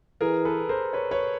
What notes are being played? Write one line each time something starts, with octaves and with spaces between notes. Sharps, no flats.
E3 G#4 A#4
A4 B4
A#4 C5
B4 C#5
B4 C#5